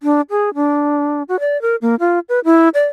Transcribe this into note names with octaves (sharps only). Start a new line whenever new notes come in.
D4
G#4
D4
F#4
D5
A#4
A#3
F4
B4
E4
D5